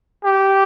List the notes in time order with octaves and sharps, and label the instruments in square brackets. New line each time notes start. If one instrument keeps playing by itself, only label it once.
[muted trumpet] G4